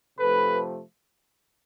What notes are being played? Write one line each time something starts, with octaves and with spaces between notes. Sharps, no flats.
C3 F3 A3 A4 B4